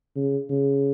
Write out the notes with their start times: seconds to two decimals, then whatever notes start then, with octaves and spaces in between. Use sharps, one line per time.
0.16 C#3
0.50 C#3